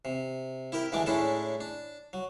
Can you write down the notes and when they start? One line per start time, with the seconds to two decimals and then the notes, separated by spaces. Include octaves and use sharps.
0.05 C3
0.72 E4 G4 A#4
0.92 D2 E3 G#3 D4 D6
1.06 A2 G#3 C#4 D4 E4 A4
1.61 D4
2.13 F#3